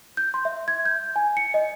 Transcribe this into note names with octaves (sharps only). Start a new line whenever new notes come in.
G6
C6
E5
G#6
G6
G#5
C#7
D#5